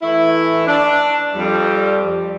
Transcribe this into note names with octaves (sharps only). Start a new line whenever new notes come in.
E3 A3 E4
D4
F2 G3